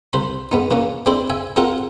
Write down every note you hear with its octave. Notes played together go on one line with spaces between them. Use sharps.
C2 C5 B5
G#2 B3 D#4
E3 A#3 C#4
G#3 C4 D4 E4 A4 C5
E5 G#5
G#3 C4 F4 A4 A#4 F#5